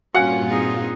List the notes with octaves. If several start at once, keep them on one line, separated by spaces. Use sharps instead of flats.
G2 A#2 C#4 F4 F#4 F5 F#5 G#5
C4 D#4 G#4